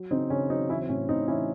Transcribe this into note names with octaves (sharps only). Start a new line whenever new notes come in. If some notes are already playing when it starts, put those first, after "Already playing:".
Already playing: F#3
C#3 C4 D#4
C#3 C#4
F#3 C4 D#4
E3 C#4 E4
C4
A2 C#4
A2 C4 D#4
E3 C#4 E4